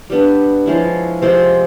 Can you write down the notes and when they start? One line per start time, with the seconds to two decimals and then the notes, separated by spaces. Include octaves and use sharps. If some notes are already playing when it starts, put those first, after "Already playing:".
0.10 G3 B3 D4
0.66 F3 G#3 C#4 E4
1.22 C3 F3 G#3 C4